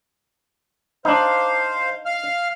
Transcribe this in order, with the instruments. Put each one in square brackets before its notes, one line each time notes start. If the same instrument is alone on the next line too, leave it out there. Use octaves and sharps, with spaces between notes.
[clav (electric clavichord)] D4 D#4 [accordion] C5 F5
[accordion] F5 F6